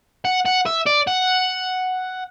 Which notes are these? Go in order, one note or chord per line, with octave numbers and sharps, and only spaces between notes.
F#5
F#5
E5
D5
F#5